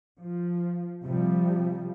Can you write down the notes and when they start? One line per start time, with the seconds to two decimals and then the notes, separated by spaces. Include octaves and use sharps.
0.20 F3
1.05 C3 F3 G3